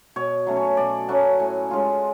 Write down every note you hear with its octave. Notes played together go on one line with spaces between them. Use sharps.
B2 C#5
F#3 A3 C#4
C#5
B2 D5
F#3 A3 C#4 F#5
A2 G#5
G#3 C#4 F4